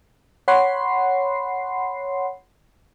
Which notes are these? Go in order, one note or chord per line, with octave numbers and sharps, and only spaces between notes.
C#5 F#5 B5 C6 C7